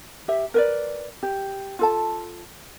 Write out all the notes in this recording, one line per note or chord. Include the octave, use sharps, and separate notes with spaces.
G4 E5
A#4 B4 D5
G4
F4 A4 A5